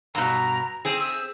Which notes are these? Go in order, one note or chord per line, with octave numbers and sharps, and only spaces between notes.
G2 B2 A#5
C4 G#4
E6